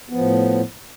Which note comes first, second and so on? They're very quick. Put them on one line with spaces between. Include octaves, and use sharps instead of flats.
B3 F3 A2